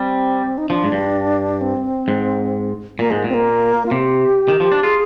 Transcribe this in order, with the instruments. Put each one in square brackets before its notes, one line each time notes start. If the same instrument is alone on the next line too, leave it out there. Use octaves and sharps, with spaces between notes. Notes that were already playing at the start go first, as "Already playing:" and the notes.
Already playing: [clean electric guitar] G3 [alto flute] C4
[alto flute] D#4
[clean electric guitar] F3 [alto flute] D4
[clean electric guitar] G#2
G2
[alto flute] C4
[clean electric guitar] G#2
[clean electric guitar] A#2 [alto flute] A#3
[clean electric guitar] G#2 [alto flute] G#3
[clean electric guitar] A#2 [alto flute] C4
[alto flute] A#3
F4
[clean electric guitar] C3 [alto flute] G4
[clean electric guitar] D#3
F3
D4
[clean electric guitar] F4 [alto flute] G#4